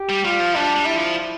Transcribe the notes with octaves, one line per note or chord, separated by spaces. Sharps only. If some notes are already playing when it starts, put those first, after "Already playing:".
Already playing: G4
G3
G3 F4
F3
G3 D4
G3
E4
F3